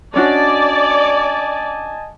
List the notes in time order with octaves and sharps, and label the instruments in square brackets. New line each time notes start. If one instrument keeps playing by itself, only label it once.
[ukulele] C#4 D4 F#4 [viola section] D5 [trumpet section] D#5 G#5 A5